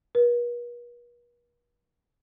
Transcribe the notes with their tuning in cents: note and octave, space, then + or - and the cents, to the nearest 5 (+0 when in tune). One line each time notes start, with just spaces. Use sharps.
B4 -45